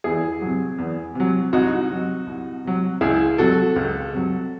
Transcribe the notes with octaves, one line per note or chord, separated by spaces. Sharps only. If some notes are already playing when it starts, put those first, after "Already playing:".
E2 E4 G#4
C3 F#3
E2
C3 F#3
C2 D#4 F#4
C3 F#3
C2
C3 F#3
C#2 E4 G#4
C3 F#3 F#4 A4
C#2
C3 F#3